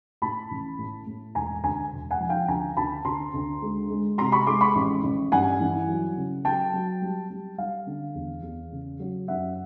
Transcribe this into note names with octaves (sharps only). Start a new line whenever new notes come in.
A2 A5 B5
A1
A2
A2
E1 G#5 A#5
D2 G#5 A#5
E1
F#5 G#5
F3
F5 G5
D2 G#5 A#5
D2 A5 B5
D2 A#5 C6
D2
G#3
G#3
C3 A#5 C6
B5 C#6
G#3 C6 D6
B5 C#6
A1
A1
G2 F#5 G#5
E3
F#3
C#3
F#3 G5 A5
F#3
G3
G3
G3 F5
D3
E2
E2
C#3
F#3
F#2 E5 F#5